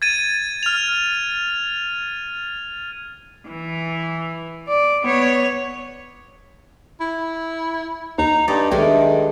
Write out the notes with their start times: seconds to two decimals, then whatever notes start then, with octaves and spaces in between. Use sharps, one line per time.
0.02 G#6 A6 D#7
0.63 F6 F7
3.49 E3
4.68 D5
5.04 B3 C#5
7.00 E4
8.18 D#2 D#4
8.48 G2 G4 D5 D#5
8.71 B1 G2 D#3 G#3 A3